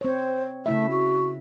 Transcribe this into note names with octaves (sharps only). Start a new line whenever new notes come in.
C4 C5 C#5
C#3 A3 E4 E5
F#4